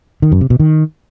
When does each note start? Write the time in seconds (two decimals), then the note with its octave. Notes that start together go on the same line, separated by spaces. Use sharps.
0.22 D#3
0.32 F#2
0.41 C3
0.50 B2
0.60 D#3